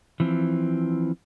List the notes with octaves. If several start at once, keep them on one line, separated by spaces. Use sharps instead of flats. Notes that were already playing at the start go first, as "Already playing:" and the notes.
E3 F3 C4